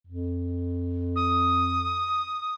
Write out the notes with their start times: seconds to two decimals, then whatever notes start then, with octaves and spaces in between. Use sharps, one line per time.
0.07 F2
1.16 D#6